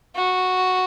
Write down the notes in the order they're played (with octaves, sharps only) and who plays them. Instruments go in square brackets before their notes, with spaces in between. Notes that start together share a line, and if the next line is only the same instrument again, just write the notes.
[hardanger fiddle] F#4